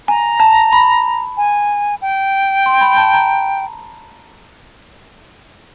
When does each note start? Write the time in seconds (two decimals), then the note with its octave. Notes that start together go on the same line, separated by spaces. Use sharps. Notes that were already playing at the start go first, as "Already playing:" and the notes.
0.08 G#5 A#5
0.40 A5
0.73 B5
1.37 G#5
2.02 G5
2.66 C6
2.81 B5
2.97 A5
3.13 A#5